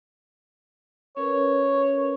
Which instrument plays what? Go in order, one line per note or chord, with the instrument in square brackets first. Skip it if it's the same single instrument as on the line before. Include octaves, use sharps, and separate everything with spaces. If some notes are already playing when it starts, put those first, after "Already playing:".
[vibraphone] C#4 A#4 B4 [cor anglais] C#5